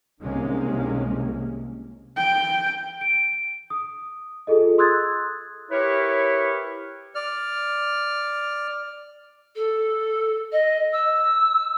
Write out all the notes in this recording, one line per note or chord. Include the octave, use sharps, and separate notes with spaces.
C2 C3 D#3 G#3 A#3 C#4
G5
D7
D#6
F4 G#4 A4 D#5
C6 D#6 E6 F#6 G#6 A6
E4 G4 A#4 B4 C#5
D5 F6
A4
D#5
E6